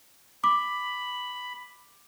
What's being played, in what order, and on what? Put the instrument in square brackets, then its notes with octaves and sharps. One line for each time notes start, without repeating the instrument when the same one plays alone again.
[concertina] B5 [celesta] D6